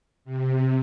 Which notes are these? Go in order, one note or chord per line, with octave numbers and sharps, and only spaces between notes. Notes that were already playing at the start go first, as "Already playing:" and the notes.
C3